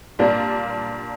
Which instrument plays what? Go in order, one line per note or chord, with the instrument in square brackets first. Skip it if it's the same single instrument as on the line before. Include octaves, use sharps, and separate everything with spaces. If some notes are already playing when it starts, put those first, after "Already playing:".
[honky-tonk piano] A#2 G3 A#3 D4